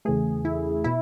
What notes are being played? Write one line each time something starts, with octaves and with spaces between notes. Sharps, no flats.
E2 C#3 E3 A3 G#4
E4
B2 E4